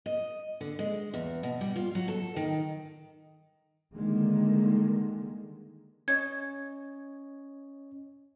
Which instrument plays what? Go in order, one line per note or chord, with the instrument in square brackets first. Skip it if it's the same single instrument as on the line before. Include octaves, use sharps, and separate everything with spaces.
[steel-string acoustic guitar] D#5
D3
G#3
E2
B2
G3
F4
F#3
A4
D#3
[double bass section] D3 D#3 G3 G#3 A#3
[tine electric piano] C#4 C#5 D#5 [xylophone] G#6